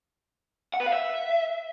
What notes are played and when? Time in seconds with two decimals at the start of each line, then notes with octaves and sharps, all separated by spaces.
0.74 F#5
0.80 B4
0.86 F5
0.93 E5